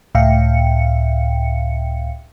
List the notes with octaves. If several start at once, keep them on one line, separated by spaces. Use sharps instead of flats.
C#2 A2 E5 F5 G5 C#7